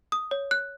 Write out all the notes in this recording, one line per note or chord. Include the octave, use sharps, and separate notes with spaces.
D#6
C#5
F#6